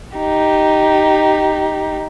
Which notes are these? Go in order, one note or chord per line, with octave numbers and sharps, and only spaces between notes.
D#4 G4